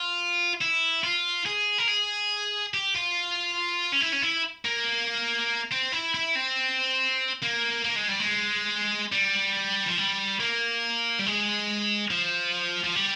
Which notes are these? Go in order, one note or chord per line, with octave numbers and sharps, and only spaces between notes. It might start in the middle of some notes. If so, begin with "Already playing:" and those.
Already playing: F4
E4
F4
G#4
A#4
G#4
G4
F4
C#4
E4
C#4
E4
A#3
C4
E4
E4
C4
A#3
A#3
G#3
G3
G#3
G3
F3
G3
A#3
G3
G#3
F3
F3
G3